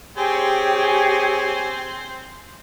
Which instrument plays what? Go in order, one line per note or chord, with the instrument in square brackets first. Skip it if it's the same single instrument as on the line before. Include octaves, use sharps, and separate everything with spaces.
[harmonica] C4 C5 [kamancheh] G4 [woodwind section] G#4 C#5 G#5